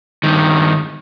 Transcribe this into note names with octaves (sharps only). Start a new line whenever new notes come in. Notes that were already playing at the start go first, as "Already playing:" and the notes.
G2 D#3